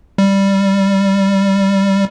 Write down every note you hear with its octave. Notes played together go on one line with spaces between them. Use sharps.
G3